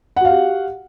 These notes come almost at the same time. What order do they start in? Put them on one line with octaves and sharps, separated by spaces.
F#5 F#4 F5 G4